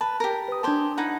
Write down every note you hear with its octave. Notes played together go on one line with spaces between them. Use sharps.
B4 A5
G4 A#4
B4 D#6
D4 G4 C5 G#5 A5
D#4 E4 F#5